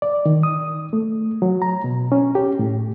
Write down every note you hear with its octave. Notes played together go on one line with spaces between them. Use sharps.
D5
D#3
D#6
A3
F#3
A#5
B2
C#4
G4
A2